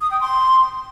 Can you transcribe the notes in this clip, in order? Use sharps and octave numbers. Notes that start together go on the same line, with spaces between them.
D#6
G5
C6